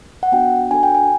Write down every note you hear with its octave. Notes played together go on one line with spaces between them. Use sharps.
F#5
B3 D4 F#4 G5
D4 F#4 A4 G#5
G5
G#5